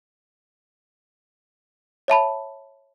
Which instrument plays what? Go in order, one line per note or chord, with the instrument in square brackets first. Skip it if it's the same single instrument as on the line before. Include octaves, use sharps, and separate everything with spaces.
[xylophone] C#5 E5 A5 B5